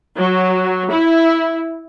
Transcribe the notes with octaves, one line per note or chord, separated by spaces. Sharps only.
F#3
E4